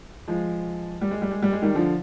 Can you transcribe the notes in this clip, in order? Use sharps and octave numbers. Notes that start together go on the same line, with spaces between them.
F3 G#3
G3
G#3
G3
G#3
G3
G#3
D#3 G3
D3 F3